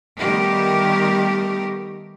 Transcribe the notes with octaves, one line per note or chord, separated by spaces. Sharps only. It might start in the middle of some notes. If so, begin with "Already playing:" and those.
D#3 G3 A3 B3 G4 A#4